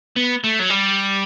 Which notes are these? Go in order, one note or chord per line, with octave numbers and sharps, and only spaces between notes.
B3
A3
F#3
G3